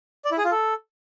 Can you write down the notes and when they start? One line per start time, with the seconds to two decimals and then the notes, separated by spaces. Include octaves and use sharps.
0.25 D5
0.31 E4
0.38 G#4
0.45 F4
0.51 A4